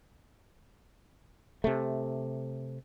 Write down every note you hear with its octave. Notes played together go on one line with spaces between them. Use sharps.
C3 A3